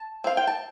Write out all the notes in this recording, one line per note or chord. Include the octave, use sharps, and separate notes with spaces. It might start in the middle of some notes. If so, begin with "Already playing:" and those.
Already playing: A5
C4 F5
G5
A5